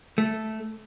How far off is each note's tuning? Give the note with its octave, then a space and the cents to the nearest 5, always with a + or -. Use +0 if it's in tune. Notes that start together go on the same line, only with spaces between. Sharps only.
A3 -5